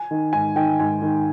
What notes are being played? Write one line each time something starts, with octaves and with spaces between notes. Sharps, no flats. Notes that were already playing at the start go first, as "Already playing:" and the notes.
Already playing: G#5
D#3
G#2 G#5
D#3 G5
G#2 G#5
D#3